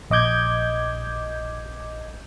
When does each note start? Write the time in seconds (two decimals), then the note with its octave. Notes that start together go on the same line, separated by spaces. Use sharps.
0.10 A#1 D#5 D6 G6 G#6